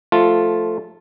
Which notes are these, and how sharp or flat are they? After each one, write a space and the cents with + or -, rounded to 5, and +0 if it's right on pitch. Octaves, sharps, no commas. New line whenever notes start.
F3 +0 A3 +0 F4 +0